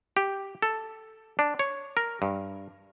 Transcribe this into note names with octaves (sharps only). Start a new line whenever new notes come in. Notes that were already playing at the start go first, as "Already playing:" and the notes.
G4
A4
D4
C#5
A#4
G2